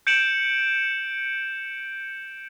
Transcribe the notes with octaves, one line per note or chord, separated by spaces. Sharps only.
G6 C#7 D7 E7 F#7